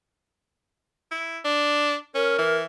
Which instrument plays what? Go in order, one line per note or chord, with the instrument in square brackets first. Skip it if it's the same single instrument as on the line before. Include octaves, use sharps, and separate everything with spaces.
[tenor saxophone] E4
D4
[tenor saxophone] C#4 [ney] A#4
[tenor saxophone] E3